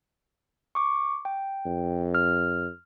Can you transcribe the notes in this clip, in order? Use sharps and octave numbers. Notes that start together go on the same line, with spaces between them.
C#6 D6
G5
F2
F6